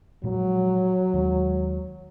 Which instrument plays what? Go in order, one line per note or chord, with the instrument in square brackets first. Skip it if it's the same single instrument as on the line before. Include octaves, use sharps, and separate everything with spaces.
[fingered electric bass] A#2 F3 G#3 [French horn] F#3
[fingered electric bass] D#2 D#3 G#3